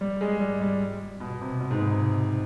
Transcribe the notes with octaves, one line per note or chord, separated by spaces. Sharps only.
G3
G#3
G3
G3
B2
C3
B2
G#2
B2
C3